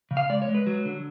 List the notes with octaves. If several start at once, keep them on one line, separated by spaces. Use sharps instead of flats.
C#3
F5
G#3 D5
C#5
G#3
B4
F#3
D3